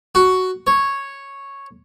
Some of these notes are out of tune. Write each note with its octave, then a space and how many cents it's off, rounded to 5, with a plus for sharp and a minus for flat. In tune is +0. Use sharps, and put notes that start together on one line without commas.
F#4 +5
C#5 -5